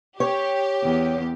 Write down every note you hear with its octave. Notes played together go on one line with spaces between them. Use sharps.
G4 C#5
E2